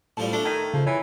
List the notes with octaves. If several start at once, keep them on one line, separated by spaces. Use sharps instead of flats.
A2 F3 G3 A5
A3 D4
D#3 G#6
C#3 F3
E3 C#5